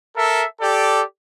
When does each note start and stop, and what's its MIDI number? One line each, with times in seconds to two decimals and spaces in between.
0.16 0.44 69
0.16 0.44 70
0.16 0.44 76
0.61 1.02 67
0.61 1.02 69
0.61 1.02 74